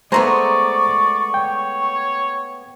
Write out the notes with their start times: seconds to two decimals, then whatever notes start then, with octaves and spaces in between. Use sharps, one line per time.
0.12 G#3 A3 B3 C5 D5 A#5 C6 C#6
1.34 C#5 G5